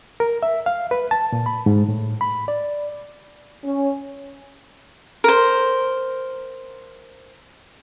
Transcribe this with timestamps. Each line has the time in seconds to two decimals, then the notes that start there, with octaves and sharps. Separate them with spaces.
0.20 A#4
0.43 E5
0.66 F5
0.91 B4
1.11 A5
1.32 A#2
1.46 B5
1.66 G#2
1.88 A2
2.21 B5
2.48 D5
3.65 C#4
5.24 A#4 C5